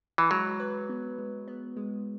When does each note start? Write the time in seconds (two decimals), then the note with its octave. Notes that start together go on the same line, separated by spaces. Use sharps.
0.18 E3
0.30 F#3 G#3
0.60 B4
0.89 B3
1.18 G#3
1.48 B3
1.77 G#3